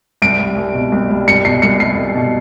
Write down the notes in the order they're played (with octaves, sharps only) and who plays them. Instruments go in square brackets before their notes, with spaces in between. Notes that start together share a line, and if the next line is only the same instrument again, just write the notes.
[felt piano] C2 [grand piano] D7
[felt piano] G3
C2
B2
C2
G3
[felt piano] C2 [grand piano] C#7
[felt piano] B2 [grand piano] C7
[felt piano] C2 [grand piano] C#7
[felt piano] G3 [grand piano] C7
[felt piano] C2
B2